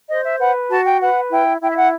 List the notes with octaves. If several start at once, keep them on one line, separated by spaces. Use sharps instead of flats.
C5 D#5
E5
B4 F#5
F#4 A5
G5
B4 F#5
E4 G5
E4 G5
E5
F#5